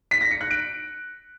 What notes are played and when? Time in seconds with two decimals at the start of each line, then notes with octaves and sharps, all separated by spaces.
0.11 B6
0.21 A#6
0.31 C#7
0.41 F#6
0.51 D7